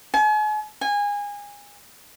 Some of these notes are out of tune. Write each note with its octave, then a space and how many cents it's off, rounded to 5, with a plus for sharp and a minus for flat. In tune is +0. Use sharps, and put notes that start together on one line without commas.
G#5 +40
G#5 -25